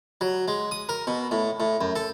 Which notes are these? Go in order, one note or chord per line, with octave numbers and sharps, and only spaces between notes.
F#3
G#3
D#6
A#4
B2
A2
A2
F#2
A4